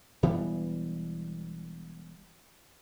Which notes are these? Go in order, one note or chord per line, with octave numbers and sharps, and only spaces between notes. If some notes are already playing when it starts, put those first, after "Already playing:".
E1 E3 G3 B3